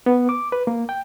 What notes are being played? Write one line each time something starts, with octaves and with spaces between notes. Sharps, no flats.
B3
D6
B4
A#3
G5